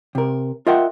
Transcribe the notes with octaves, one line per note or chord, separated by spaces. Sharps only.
C3 A#4
F4 A#4 D#5 E5 F#5 G5